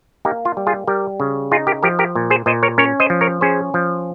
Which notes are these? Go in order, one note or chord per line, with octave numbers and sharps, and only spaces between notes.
A#3 D#4 G4
F4
G3
F4 G#4
G3 G4 A#4
C#3
D#4 F4 G#4
G4 A#4
F3 G4 A#4
G4 A#4
A#2
G#4 C5
A#2 C5 D#5
A#4 C#5
C#4 A#4 C#5
C5 D#5
F3
A#4 C#5
C#4 G#4 C5
F3